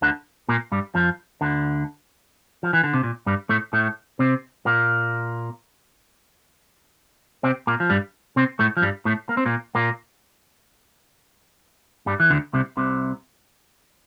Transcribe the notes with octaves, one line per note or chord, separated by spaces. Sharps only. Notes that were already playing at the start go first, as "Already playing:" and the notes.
D2 D3
A#2 A#3
G2 G3
F2 F3
D2 D3
F3
E3
D3
C3
A#2
G2 G3
A2 A3
A2 A3
C3 C4
A#2 A#3
C3 C4
A#2 A#3
F3
G2 G3
C3 C4
A2 A3
F3
G2 G3
A2 A3
A#3
C4
A#2 A#3
A#2 A#3
G2 G3
E3
D2 D3
C2 C3
C2 C3